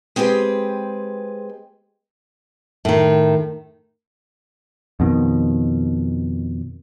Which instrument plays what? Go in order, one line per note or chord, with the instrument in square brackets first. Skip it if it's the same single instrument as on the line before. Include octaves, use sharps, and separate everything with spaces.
[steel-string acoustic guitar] G#3 C4 G4 G#4 B4
[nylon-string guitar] A2 D#3
[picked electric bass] F2 B2 D#3